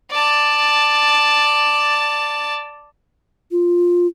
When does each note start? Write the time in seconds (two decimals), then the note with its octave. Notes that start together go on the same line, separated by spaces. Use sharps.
0.11 D5 A5
3.51 F4